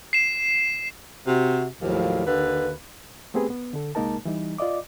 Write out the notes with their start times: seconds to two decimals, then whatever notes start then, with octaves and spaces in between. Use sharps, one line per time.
0.13 C7 E7
1.26 C3 F#4
1.81 D#2 A2 F3 F#3
2.25 D#2 D3 B4
3.34 A3 B3 C4 G4 G#4 B4
3.50 B3
3.73 D3 A4
3.95 C2 G#3 A#3 D#4 A#4 A5
4.25 E3 G3 D#4
4.58 F4 D5 D#5 D6